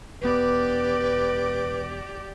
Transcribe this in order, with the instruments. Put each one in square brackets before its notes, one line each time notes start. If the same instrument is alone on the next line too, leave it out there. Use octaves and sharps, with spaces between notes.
[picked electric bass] E1 B3 [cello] G4 D5 [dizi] B4